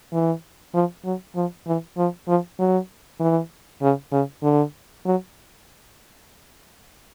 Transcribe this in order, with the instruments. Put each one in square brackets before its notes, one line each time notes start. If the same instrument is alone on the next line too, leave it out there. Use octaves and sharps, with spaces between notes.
[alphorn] E3
F3
F#3
F3
E3
F3
F3
F#3
E3
C#3
C#3
D3
F#3